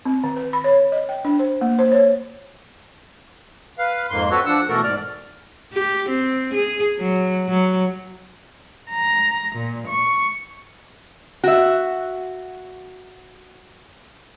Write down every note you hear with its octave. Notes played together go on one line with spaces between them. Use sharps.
C4
D#3
B4
B5
C#5
D#5
G5
D4
C5
A#3
C5
C#5
B4 F5
F2 G#2 A#3 C6
C4 F#4 A4 B4 C#5
F3 D4 F#5 E6
B2 E3 A3 F#4 A4 A#4
G#2 D5 F6
G4
C4
G#4
F#3
F#3
A#5
A#2
C#6
F#4 E5